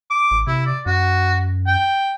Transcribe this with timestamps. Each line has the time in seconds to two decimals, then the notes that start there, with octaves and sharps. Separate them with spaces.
0.10 D6
0.31 A1
0.47 C3 E4
0.66 D5
0.86 F#2 F#4
1.67 G5